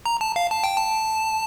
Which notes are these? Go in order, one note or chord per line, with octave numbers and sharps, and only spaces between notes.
A#5
A5
F5
A5
G5
A5